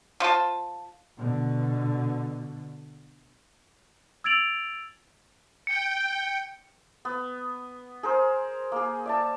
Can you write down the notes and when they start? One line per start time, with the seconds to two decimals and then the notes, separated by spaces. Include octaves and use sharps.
0.20 F3 F4 F#4 A5
1.18 B2 D3
4.24 E6 G#6 A6 D7 F7 F#7
5.67 G5 C#7
7.05 B3
8.03 G#4 A#4 C5
8.72 A#3 G#4
9.06 D5 E5 A5